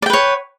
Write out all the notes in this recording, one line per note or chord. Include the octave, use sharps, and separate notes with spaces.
B4 C#5 D5 G5